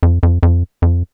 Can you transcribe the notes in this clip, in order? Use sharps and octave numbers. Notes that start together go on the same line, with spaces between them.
F2
F2
F2
F2